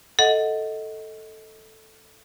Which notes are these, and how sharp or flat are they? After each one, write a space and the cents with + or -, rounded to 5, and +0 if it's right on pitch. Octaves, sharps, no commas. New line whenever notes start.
A4 +0 D#5 +20 F#5 +0